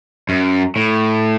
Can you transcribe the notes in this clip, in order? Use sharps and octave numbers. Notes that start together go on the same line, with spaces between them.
F#2
A2